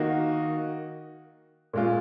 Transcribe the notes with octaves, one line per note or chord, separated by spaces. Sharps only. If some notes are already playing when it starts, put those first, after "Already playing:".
Already playing: D#3 A#3 D#4 F#4
A#2 G#3 C#4 F4